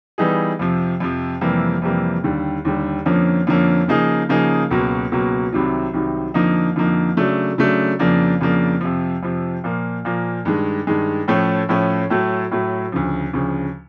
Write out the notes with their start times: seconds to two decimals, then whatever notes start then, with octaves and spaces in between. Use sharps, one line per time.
0.18 E3 G3 B3 D#4 G#4
0.59 F2 C3 F3
1.00 F2 C3 F3
1.41 F2 C3 E3 G3 A#3
1.82 F2 C3 E3 G3 A#3
2.24 D#2 D3 G3
2.65 D#2 D3 G3
3.06 F2 D3 F3 A#3 C#4
3.47 F2 D3 F3 A#3 C#4
3.88 C#3 F3 A#3 D#4 G#4
4.29 C#3 F3 A#3 D#4 G#4
4.71 C#2 B2 F#3 A#3
5.12 C#2 B2 F#3 A#3
5.52 C2 C3 D#3 F#3
5.94 C2 C3 D#3 F#3
6.34 F2 D3 F3 A#3 D#4
6.76 F2 D3 F3 A#3 D#4
7.17 C#3 F#3 A3 D4
7.58 C#3 F#3 A3 D4
7.99 F2 C#3 F3 A#3 D4
8.41 F2 C#3 F3 A#3 D4
8.81 F2 C3 F3
9.23 F2 C3 F3
9.64 A#2 F3 A#3
10.05 A#2 F3 A#3
10.45 G2 D#3 G#3
10.87 G2 D#3 G#3
11.28 A2 F3 A3 C#4
11.69 A2 F3 A3 C#4
12.10 A2 F#3 A3
12.51 A2 F#3 A3
12.92 D2 C#3 F3
13.33 D2 C#3 F3